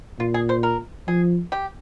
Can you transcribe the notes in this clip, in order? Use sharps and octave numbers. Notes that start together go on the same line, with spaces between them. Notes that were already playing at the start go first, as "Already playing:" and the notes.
A#2 F4
G#4
C5
A#4
F3 G#4
G4